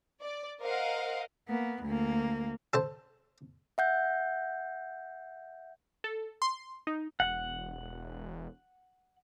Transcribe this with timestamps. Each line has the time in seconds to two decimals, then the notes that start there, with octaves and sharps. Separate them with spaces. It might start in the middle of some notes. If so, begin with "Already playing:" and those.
0.22 D5
0.61 A#4 C5 D#5 F5 F#5
1.48 A#3 B3
1.84 D2 A#3
2.73 A4 C5 A5
3.78 E5 F#5 G6
6.04 A4
6.42 C6
6.87 D#4
7.20 E1 F#5